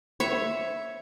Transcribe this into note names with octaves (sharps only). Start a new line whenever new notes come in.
C#5 E5